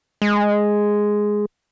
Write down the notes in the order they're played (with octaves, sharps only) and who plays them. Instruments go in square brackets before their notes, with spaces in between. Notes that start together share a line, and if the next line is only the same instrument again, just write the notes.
[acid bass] G#3